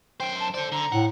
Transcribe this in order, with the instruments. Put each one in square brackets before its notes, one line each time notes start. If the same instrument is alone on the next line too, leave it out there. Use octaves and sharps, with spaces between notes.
[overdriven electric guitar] F#2 C5 [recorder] G5
[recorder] A5
[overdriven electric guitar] A4 D5 [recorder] C5
[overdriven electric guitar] D3 [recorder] A#5
[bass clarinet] A2 [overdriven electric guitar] F#5